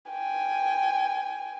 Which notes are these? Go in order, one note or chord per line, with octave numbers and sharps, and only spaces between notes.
G5 G#5